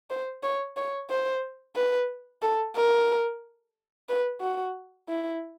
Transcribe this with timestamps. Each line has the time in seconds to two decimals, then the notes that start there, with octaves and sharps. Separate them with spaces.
0.10 C5
0.43 C#5
0.77 C#5
1.10 C5
1.76 B4
2.42 A4
2.76 A#4
4.09 B4
4.41 F#4
5.09 E4